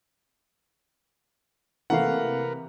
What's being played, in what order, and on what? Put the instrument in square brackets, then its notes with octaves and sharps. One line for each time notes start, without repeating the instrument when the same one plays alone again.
[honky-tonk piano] C3 E3 [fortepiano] A3 A#3 F5 [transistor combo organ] A#4 B4 [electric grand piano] F#5